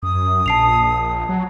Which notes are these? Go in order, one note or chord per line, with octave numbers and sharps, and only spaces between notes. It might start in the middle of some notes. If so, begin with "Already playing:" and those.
F#2 D#6
A#1 A5 C7 F7
F#3